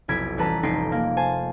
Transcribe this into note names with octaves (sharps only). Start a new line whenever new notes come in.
F1 B1 E4 G#6 B6 D7
A1 G3 B4 A5 A#5 B6
F1 C3 D#4 G5 B6 C7
A#3
C5 G#5 A5